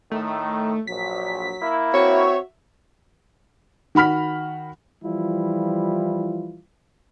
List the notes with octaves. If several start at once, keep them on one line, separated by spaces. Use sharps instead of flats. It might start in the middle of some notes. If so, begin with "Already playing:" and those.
A2 D#3 A3
A#1 F#3 B6
A#3 E4
C4 F#4 C#5 E5
D#3 F#4 B5 F6 B6
E3 F3 G3 E4 F4